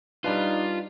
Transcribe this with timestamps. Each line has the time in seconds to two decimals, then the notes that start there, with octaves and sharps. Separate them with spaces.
0.24 G3 D4 D#4 F4 B4